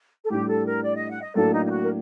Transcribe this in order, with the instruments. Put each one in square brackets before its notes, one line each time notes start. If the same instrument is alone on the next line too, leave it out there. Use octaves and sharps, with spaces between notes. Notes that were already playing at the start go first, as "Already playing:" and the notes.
[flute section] A4
[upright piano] A2 G3 D4 [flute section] G4
[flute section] A4
A#4
D5
D#5
F#5
D#5
[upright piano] A2 F#3 A#3 D4 [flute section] A4
[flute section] D#4
D#4
F#4
A#4